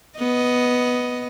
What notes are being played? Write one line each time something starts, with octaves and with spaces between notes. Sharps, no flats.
B3 D#5